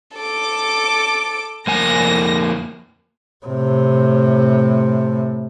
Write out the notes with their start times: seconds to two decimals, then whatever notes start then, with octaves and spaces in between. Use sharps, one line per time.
0.18 A4 D6
1.67 F2 A#3 G#5 A#6
3.46 A2 C3